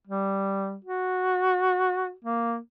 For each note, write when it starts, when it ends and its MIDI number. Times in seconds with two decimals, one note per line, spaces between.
0.07 0.76 55
0.84 2.13 66
2.24 2.57 58